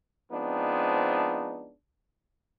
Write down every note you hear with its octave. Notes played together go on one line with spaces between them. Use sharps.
F3 G#3 B3 C4 D4 D#4